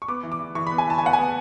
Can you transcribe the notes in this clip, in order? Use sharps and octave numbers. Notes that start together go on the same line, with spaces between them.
C#6
B3 D6
E3
D6
E3
E3 C#6
B5
B3
G#5
E3 A5
G#5
B3 F#5
G#5
B3